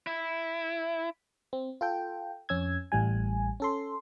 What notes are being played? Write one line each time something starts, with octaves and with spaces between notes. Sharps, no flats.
E4
C4
F4 A4 G5
F2 C#4 E6 G#6
A1 A2 G3 G#5
C#4 A4 C6